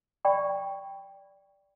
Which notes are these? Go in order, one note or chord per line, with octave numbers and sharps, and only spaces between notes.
D5 G5 B5 C#6